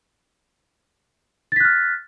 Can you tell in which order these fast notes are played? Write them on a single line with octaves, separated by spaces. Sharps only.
A6 B6 F#6 F6